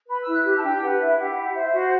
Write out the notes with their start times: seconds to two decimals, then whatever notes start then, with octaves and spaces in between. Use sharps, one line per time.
0.07 B4 B5
0.22 E4 E6
0.31 F#6
0.44 G4 F#6
0.57 A5
0.61 D4 G5
0.80 B4 F#5
0.98 E4 E5
1.17 G4 F#5
1.29 F#5
1.35 E4
1.42 F#5
1.53 C5 E5
1.64 E5
1.72 F#4 F#5